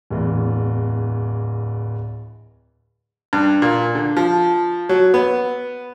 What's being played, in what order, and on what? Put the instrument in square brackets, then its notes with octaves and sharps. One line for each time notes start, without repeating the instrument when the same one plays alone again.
[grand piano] D1 E2
[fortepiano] G2
A#2
D3
F3
F#3
B3